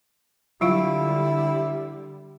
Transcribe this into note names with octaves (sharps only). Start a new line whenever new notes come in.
D3 F#3 G3 E4 F4 F5